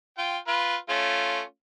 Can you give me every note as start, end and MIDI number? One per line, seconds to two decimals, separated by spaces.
0.18 0.38 65
0.18 0.38 79
0.48 0.76 65
0.48 0.76 71
0.89 1.42 57
0.89 1.42 61
0.89 1.42 65